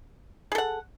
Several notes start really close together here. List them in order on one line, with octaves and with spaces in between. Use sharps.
G#4 A4 F#5